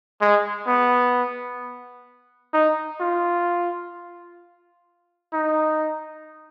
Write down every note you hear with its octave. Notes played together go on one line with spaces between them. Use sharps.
G#3
B3
D#4
F4
D#4